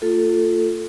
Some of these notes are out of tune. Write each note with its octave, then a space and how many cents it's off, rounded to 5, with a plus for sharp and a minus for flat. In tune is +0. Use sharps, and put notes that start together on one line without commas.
A#3 -45 F4 +0 A4 +0